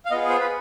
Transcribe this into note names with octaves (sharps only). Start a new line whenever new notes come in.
F5
B3 F4 G#4 D#5
C5
B4